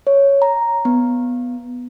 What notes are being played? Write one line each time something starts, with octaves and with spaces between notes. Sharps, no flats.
C#5
A#5
B3